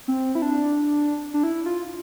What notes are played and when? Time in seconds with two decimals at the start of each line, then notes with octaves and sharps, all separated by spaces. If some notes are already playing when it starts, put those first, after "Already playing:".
0.08 C4
0.35 E4
0.42 D4
1.34 D4
1.43 E4
1.66 F4